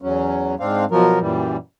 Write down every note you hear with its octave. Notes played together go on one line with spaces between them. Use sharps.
E2 F#3 C#4
G#2 C4 D4 F5
B2 F3 F#3 A#4
F#2 A#2 E3 G3